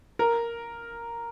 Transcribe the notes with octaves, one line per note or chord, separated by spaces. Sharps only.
A#4